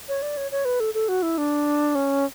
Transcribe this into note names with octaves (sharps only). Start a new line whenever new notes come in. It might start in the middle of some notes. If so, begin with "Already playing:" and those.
C#5
D5
C#5
C#5
B4
A4
A4
F#4
E4
D4
C#4